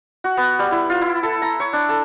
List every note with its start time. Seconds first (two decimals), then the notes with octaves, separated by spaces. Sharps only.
0.24 F#4
0.37 B3
0.59 G3
0.72 E4
0.90 F4
1.02 E4
1.23 A4
1.42 A#5
1.60 C#5
1.73 D4
1.89 A4